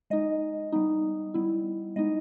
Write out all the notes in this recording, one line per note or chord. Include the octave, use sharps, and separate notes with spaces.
G#3 D#4 D#5
G3 B3 D#4
G3 B3 E4
G#3 B3 D#4 D#5